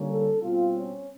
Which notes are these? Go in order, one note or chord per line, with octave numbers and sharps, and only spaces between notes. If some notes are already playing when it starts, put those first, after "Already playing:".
Already playing: D3 G3 A#3 C#4
A4
B2 G3 C4 F4
C#4